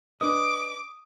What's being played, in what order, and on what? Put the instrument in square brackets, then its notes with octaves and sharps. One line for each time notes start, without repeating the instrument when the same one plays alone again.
[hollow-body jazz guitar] D4 B4 D#5 [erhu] D6 [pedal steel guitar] D#6